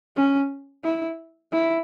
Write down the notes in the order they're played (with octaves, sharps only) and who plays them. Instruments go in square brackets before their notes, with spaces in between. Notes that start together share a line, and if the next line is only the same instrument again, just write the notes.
[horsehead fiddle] C#4
E4
E4